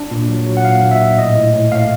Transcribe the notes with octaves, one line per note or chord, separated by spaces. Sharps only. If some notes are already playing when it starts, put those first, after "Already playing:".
Already playing: D4
A#2
F#3
F#3
F#5
A#2 F5
A#2
E5
A#2
A2 D#5
A2
A2
A2 F5